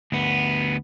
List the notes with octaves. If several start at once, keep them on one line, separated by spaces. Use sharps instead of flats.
D2 B3